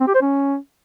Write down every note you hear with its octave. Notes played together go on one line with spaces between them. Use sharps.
C4
G4
C5
C#4